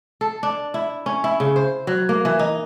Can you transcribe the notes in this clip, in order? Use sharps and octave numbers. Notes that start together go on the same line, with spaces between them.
A4
D4
E4
C#4
E4
C#3
C5
F#3
A#3
E3
D#4